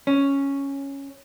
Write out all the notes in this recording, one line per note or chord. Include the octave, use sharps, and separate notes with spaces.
C#4